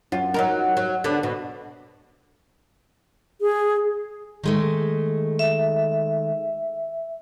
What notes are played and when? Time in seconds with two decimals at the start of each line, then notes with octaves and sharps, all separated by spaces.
0.12 F#2 F4
0.34 F#3 D#4 A#4
0.77 F#3
1.04 D3 B3 D4
1.23 B2
3.41 G#4
4.44 D#3 G#3 A3
5.39 E5